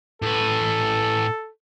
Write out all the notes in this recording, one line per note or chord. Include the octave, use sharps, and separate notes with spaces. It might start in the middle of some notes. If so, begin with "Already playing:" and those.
A2 A4 B4